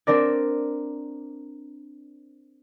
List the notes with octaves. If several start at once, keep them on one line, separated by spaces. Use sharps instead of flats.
C4 D4 A#4 D5